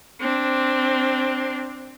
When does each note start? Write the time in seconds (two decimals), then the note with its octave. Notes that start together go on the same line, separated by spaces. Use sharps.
0.21 C4 D4